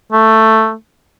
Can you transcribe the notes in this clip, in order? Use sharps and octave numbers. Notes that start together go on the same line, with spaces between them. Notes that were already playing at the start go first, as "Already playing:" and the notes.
A3